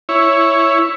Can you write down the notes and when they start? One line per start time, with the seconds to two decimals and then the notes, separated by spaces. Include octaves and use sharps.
0.09 E4 C#5